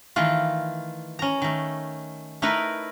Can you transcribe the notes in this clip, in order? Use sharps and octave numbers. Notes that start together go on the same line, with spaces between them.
D#3 E3 A3 F4
C#4 A#5
D#3 A3
A3 D#4 E4 A#4 B4